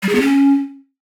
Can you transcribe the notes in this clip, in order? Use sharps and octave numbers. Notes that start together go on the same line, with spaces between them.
G3
G#4
B3
C#4